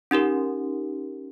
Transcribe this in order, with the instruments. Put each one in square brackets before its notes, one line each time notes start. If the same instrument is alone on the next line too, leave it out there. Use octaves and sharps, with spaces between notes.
[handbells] C#4 D#4 G4 A#4